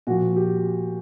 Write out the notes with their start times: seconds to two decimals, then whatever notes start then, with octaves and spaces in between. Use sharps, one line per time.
0.07 A#2 F3 F#4
0.36 G4